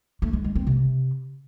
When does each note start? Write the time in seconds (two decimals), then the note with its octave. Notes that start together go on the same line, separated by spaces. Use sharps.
0.22 A3
0.33 G#3
0.44 G#3
0.55 C4
0.67 C3